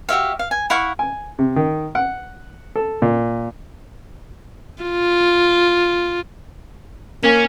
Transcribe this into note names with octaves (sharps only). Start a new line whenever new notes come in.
F#4 G4 E5 F5
F5
G#5
E4 F5 F#5 C#6
G#5
C3
D#3
F#5
A4
A#2
F4
A#3 C#4